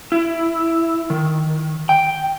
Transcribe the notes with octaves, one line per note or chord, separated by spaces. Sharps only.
E4
D#3
G5